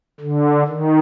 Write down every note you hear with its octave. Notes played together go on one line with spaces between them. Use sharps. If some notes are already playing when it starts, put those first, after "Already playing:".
D3
D#3